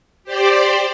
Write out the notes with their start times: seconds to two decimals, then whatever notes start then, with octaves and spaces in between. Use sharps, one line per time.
0.24 G4 C5 D5